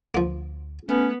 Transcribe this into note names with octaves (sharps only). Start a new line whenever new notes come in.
D2 F3 A#3
A3 B3 C#4